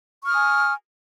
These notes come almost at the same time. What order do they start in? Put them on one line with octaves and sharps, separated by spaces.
C#6 F6 D#6 G#5